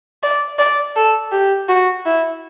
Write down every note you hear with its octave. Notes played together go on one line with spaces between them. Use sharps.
D5
D5
A4
G4
F#4
E4